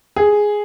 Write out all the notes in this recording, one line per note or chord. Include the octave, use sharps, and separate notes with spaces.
G#4